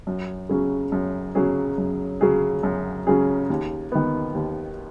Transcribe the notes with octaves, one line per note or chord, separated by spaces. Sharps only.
F#2
C#3 F#3 C#4 G#4
F#2
C#3 F#3 C#4 G#4
F#2
C#3 F#3 C#4 G#4
F#2
C#3 F#3 C#4 G#4
D#2
D#3 B3
D#2